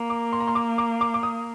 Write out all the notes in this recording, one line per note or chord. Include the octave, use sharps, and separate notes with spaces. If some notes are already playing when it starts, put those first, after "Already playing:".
Already playing: A#3
D6
C6
A#5
C6
D6
D6
D6
D6
D#6